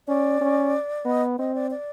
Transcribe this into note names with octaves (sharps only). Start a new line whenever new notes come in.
C#4 D5
C#4
B3 D#5
C4 D#5
D5
D5